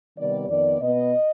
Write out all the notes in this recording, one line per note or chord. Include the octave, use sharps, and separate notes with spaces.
C3 D#3 G3 B3 D5
F2 D#3 B3 D5
B2 B3 D#5